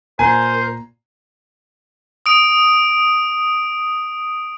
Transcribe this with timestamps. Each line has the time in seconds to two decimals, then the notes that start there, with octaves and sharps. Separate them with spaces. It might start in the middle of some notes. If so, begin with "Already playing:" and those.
0.19 A#2 A#4 C5 G#5 A#5 C7
2.26 D#6 D7